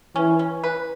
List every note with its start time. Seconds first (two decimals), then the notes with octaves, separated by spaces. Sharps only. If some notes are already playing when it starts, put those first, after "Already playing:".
0.15 E3 C#4
0.39 C#4
0.64 B4